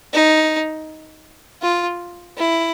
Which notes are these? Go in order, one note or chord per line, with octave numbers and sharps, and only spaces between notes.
D#4
F4
E4